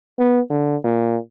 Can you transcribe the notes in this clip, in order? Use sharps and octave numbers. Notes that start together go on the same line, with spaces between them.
B3
D3
A#2